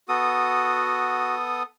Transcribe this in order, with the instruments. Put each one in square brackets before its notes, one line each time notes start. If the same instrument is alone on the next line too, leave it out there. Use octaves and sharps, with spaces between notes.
[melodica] B3 A4 D#6 [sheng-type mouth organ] F#4